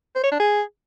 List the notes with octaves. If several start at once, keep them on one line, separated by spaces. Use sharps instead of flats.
C5
C#5
D4
G#4